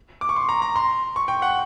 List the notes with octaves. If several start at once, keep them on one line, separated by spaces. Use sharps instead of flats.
D6
C#6
C6
A#5
A#5
C6
C#6
G5
F#5